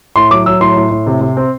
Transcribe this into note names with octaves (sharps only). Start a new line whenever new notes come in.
A2 C6
F#3 D6
F#3 E6
A2 C6
A2
A2
C3
C3
C4